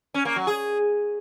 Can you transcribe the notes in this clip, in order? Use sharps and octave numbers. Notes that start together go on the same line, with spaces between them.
C#4
A#3
F#3
G#4